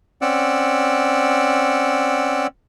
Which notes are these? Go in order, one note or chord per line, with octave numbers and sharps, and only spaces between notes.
C4 C#4 D5 F#5 E6